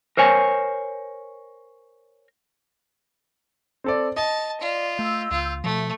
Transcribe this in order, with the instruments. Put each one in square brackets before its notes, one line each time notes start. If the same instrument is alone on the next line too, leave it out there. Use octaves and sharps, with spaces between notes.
[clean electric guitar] A#4 C5 C#5 G#5
[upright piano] C4 A4 D5
[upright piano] D#5 [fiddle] A5
[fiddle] F4 [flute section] D5
[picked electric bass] A3 [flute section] E6 G6
[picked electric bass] C#2 [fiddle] F4
[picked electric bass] B2 F3 [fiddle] A3 [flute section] E5